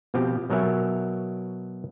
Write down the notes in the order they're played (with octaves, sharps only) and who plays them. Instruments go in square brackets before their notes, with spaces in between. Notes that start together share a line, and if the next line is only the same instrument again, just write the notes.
[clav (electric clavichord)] B2 F3 C4 G4
B2 F#3 A#4 C#5 E5 G#5